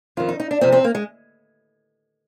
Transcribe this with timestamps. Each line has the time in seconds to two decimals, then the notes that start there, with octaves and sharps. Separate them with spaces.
0.17 F2 D#3 F4
0.29 D#4
0.40 D#4
0.51 D4
0.61 F2 C3 F3 C4
0.72 C4
0.84 A#3
0.95 G#3